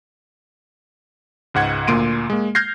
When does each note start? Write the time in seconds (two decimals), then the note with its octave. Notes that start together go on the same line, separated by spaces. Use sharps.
1.54 C#2 G#2 F#5 G#6
1.87 D2 A#2 A#3 C6 D7 D#7
2.30 G#3 A#3
2.55 F6 G6 G#6 A#6 C7